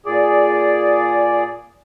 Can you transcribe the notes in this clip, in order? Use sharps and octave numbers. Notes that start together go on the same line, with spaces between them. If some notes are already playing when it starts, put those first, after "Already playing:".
A#2 G#4 D5